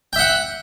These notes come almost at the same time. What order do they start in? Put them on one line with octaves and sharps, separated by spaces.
G5 E5 F#5